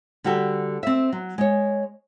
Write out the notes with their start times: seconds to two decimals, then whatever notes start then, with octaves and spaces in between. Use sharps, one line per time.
0.24 D3 G3 F#4 G4 A4
0.83 C4 E5
1.13 F#3
1.38 G#3 C#5